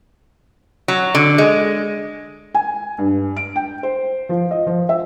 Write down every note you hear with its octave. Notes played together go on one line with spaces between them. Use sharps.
F#3
D3
G#3
G#5
G2
D7
G5
C5
F3
D#5
F3
E5